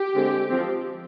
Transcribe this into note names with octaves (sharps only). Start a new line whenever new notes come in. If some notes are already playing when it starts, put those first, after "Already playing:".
Already playing: G4
D3 G#3 C4
F3 C4